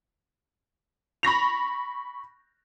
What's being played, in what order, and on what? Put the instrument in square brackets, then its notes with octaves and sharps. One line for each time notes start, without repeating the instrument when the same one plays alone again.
[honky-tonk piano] B5 C#6 A#6 F7